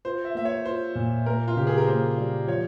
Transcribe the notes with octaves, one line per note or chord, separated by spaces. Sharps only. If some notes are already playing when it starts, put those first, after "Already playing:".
F4 C5
E5
A#3 E5
C#5
F4 C5
A#2
A#3 A#4
F4
C#3 G4
G#4
A#4
A#3 C5
G3
F3 C#5